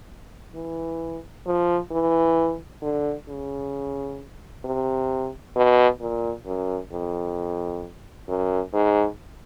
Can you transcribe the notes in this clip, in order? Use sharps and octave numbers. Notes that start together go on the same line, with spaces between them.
E3
F3
E3
D3
C#3
C3
B2
A#2
F#2
F2
F#2
G#2